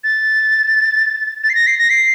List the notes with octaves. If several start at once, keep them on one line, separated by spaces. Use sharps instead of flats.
A6
A6
C7
A#6
C7
A#6
C7